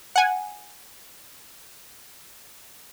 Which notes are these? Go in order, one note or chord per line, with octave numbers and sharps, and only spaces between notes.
F#5 G#5